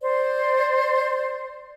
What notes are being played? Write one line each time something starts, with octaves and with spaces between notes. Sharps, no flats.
C5 D5